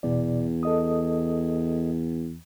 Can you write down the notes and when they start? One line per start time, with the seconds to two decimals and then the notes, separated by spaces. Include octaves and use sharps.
0.03 E2 B2 D5
0.63 A4 D#5 D#6